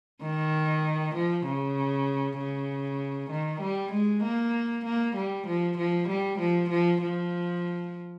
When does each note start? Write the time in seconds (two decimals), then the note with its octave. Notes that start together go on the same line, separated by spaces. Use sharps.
0.22 D#3
1.15 F3
1.45 C#3
2.38 C#3
3.31 D#3
3.61 G3
3.92 G#3
4.23 A#3
4.85 A#3
5.16 G3
5.47 F3
5.77 F3
6.08 G3
6.39 F3
6.70 F3
7.01 F3